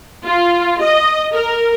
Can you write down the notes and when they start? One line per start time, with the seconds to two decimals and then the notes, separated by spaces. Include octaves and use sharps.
0.25 F4
0.82 D#5
1.33 A#4